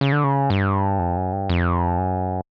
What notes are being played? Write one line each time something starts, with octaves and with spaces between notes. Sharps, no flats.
C#3
D3
C#3
G2
F2
F#2
G2
F2
F#2